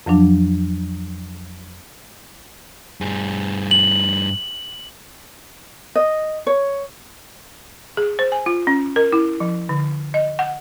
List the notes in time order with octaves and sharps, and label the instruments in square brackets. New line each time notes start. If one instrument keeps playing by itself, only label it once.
[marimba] F2 F3 F#3 D4
[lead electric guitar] G2 G#4
[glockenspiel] F#7
[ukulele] D#5
C#5
[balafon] G#4
C5
G#5
F4
C#4
A#4
E4
F3
D3
D#5
F#5